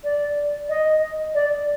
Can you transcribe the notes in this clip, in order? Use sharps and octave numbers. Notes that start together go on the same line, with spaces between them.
D5
D#5
D5